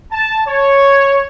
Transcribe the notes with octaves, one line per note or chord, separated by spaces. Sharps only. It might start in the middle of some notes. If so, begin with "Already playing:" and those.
A5
C#5